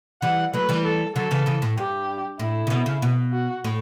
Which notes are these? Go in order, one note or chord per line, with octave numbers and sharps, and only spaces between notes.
E3 G3 F#5
F#3 A3 B4
E3 G3
A4
D3 F#3 A4
C#3 E3
C#3 E3
A2
G2 G4
A2 E4
C#3
B2
C#3
B2
F#4
A2